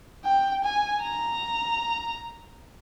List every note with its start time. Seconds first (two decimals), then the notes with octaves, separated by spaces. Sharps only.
0.25 G5
0.64 G#5
1.04 A#5